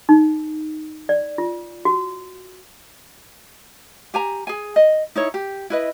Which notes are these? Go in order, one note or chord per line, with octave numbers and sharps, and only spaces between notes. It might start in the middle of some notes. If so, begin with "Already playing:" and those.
D#4
D5
F4
F#4
G4 G#5 A#5
G#4 G#5
D#5
D#4 E4 C#5
G4
E4 B4 D#5